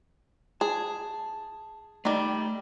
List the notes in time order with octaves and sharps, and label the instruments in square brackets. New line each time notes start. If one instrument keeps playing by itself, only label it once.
[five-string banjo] G#4 [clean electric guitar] A5
[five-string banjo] D#3 G3 [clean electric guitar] A3